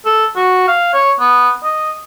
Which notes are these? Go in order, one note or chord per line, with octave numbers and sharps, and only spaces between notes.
A4
F#4
F5
C#5
B3
D#5